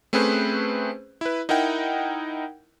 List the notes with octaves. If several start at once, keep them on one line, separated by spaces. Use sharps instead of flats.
A3 C4 C#4 G#4 B4 C5
E4 B4
D#4 E4 A#4 F#5 G5